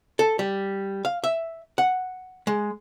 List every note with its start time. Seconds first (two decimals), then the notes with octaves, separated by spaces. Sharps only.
0.19 A4
0.39 G3
1.05 F5
1.24 E5
1.78 F#5
2.47 G#3